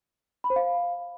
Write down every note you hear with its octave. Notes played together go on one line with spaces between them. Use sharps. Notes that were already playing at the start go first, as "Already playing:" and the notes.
B5
C5
F5